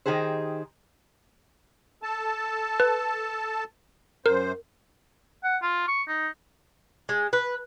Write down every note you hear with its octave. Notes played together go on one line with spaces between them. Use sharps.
D#3 D#4 G4 G#4 C5
A4 A5
B4
F#2 A#4 C5
F#5
F4
C#6
D#4
G#3
B4